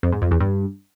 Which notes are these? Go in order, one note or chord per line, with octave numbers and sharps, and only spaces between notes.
F2
G#2
F2
E2
G2